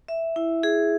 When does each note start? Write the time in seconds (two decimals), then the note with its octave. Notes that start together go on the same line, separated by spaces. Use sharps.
0.08 E5
0.36 E4
0.63 G#4